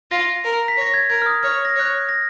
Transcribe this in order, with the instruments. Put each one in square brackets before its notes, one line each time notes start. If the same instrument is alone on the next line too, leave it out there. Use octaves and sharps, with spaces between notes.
[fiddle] F4 [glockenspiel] A#6
[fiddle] A#4
[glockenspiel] B6
[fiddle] C#5 [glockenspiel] A#6
[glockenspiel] G#6
[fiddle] A#4 [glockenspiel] G#6
[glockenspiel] F6
D#6
[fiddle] C#5 [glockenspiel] F6
[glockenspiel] A#6
[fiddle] C#5 [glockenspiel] F#6
[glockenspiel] G#6
A#6